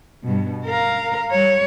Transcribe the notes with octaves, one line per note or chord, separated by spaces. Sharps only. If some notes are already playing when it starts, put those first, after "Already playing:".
G2 B2
A#4 F5
G3 C#5